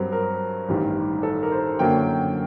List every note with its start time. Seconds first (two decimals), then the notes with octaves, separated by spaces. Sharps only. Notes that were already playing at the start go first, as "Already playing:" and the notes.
Already playing: G2 F#3 C4 A#4
0.12 A#4
0.68 A1 G2 D#3 G3
1.23 A4
1.43 A#4
1.52 C5
1.79 F#2 D3 F#3 A#3 G5